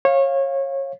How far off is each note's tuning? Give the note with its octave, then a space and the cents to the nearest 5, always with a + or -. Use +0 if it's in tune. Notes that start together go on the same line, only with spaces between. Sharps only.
C#5 -25 F5 +0